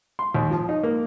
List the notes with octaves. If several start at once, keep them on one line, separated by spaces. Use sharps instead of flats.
C6
D#2
F3
D#4
A#3